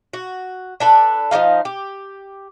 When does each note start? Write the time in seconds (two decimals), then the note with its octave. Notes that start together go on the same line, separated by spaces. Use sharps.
0.13 F#4
0.80 D4 A4 B4
1.31 F3 G3 D#4 F5
1.65 G4